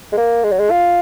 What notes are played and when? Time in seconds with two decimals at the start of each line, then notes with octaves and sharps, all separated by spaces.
0.13 G#3
0.17 A#3
0.44 G#3
0.52 F#3
0.59 G#3
0.71 F4